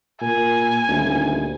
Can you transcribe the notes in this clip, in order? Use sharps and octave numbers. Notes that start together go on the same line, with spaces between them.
A#2 G#5
D#1 D2